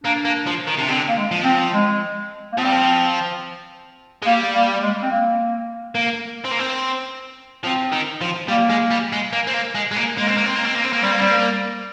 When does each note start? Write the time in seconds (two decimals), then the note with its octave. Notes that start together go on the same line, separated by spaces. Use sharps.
0.04 A#3 D4
0.25 A#3
0.47 F3
0.68 D#3
0.78 C3 D4
0.89 D3 C4
1.08 A#3
1.17 G#3
1.31 F3
1.44 C4
1.73 G#3
2.53 A#3
2.57 F3 C4
2.65 G3
2.72 F3
4.22 G#3
4.26 G3 A#3
4.55 A#3
4.83 G#3
5.02 C4
5.11 A#3
5.95 A#3
6.45 C4
6.52 A#3
6.60 C4
7.64 F3 C4
7.92 D#3
8.21 F3
8.48 G3 A#3
8.70 G#3
8.91 G3
9.13 G#3
9.33 A#3
9.47 C4
9.54 A#3
9.75 G#3
9.91 G#3
9.96 A#3
10.17 G#3 A#3
10.27 C4
10.37 A#3
10.45 C4
10.56 A#3
10.65 C4
10.75 A#3
10.84 C4
10.93 A#3
11.03 G3 C4
11.11 A#3
11.17 G3 C4
11.31 A#3